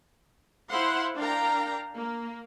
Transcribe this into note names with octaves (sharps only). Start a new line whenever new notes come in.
E4 C5 F5 F#5 C6
D4 A#4 F5 G5 A#5
A#3